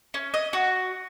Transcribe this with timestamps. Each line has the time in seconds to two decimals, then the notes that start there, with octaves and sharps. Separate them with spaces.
0.14 C#4
0.34 D#5
0.53 F#4